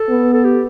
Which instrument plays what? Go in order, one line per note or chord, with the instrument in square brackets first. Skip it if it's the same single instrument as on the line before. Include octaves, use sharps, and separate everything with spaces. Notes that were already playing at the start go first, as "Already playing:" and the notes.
Already playing: [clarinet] A4
[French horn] B3
[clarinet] A4
G4